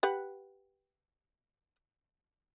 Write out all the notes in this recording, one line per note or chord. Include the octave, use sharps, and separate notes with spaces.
G4 B4 F#5